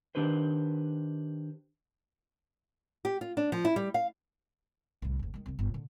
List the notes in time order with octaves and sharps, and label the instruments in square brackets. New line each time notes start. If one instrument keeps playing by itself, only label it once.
[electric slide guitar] D#3 D4 G4 B4 C5
[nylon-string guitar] G4
F4
D4
F3
E4
G3
F5
[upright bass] C2 A2
F#1 D2
D#3 G#3
C2 D#3
G1 F4
A#2 D3